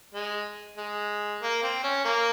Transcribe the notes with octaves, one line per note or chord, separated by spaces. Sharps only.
G#3
G#3
A#3
C4
C#4
A#3